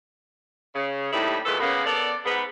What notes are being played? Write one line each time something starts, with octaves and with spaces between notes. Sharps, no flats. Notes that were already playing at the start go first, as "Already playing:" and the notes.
C#3
D#2 A2 C3 G3 D#4 E4
D#2 A#2 E3 G#3 B3 A4
C#3 A#3 B3
B3 A4 A#4 D5
G#2 B3